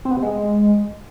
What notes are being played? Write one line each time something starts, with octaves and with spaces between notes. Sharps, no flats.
C4
B3
C3
G#3